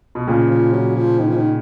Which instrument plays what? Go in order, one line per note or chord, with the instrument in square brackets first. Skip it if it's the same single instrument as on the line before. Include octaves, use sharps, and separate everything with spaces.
[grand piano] B2
[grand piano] A#2 C#3 [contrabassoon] F3
[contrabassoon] F3
F#3
F3
D#3
F3
D#3